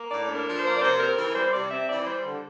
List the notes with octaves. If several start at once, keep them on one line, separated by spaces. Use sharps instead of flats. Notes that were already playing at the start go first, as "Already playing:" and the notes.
Already playing: A#3
A2 D5
D4
A#4
F3
C5
A#3
D5
C3 C5
C5
C4 A#4
E3 A#4
G3 C5
C3 D5
C4 E5
E3 D5
G3 C5
D3